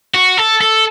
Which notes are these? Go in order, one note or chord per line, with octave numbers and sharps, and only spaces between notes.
F#4
A4
A4